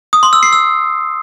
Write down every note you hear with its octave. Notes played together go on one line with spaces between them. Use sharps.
D#6
C6
E6
C7
E6